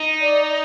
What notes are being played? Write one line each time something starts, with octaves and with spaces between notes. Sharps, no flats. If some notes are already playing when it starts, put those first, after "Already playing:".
Already playing: D#4
D5